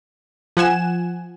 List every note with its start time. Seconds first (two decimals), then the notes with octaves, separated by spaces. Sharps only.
0.57 F3 F#5 G#5 E7